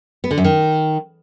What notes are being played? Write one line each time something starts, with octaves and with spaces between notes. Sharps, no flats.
B3
D3
F#2
D#3